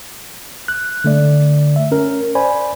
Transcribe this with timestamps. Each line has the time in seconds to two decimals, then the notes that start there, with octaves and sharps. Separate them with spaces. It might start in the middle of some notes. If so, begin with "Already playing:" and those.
0.68 F#6
1.04 D3 A3 D5
1.76 E5
1.91 C#4 A#4
2.35 C5 D5 G#5 B5